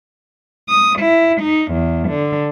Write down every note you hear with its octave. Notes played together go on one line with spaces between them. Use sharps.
D#6
E4
D#4
E2
D3